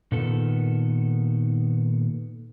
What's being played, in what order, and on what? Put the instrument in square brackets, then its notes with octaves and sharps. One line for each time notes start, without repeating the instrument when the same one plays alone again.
[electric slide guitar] A#2 D#3 B3 A4